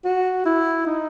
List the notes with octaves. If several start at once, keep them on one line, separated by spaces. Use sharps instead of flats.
F#4
E4
D#4